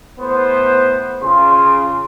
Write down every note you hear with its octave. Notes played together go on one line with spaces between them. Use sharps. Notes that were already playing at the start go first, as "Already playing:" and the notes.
A2 B3 C5
C#3 F4 C6